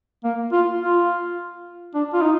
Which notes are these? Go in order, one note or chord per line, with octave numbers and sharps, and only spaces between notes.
A#3
F4
F4
D4
F4
D#4